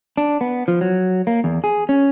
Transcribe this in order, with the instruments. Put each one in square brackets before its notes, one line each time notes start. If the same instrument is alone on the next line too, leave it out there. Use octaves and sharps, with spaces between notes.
[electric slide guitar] D4
B3
F3
F#3
A#3
E2
G#4
C#4